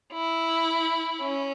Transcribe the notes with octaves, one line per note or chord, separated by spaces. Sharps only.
E4
C#4